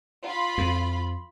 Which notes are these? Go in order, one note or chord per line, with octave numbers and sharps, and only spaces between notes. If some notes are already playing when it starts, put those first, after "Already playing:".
F4 B5
F2